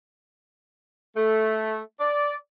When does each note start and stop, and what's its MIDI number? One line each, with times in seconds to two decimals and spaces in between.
1.16 1.79 57
1.99 2.34 74